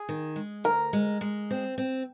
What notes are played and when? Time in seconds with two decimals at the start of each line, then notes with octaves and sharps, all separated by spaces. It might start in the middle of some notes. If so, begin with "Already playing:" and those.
Already playing: G#4
0.09 D#3
0.36 G#3
0.64 D2 A#4
0.93 G#3
1.21 G#3
1.51 C4
1.78 C4